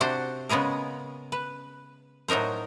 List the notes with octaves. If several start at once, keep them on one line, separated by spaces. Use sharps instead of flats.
C3 D4 F#4 C5
C#3 G#3 B3 G#4 A#4
B4
A2 F#3 D#4 A#4 C5